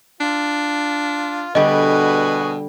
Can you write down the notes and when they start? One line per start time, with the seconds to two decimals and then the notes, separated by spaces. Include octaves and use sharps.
0.21 D4 F4
1.55 B2 D3 G3 F#4 G#4 B4 D#5